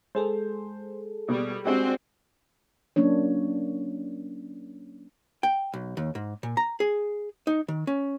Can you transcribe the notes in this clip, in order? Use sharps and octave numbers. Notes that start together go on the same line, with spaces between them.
G#3 G#4 A4 C5
B2 G3
G#3 C4 D4 F#4 G4
F#3 A#3 C#4 D4 C#5
G5
B1
D#2
G#2
A#2
A#5
G#4
D#4
D#3
C#4